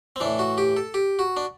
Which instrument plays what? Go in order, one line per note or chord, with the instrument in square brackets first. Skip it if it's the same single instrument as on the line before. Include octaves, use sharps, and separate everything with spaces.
[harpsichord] C4
A2 E3 D4
F#4
G4
A4
G4
F#4
D4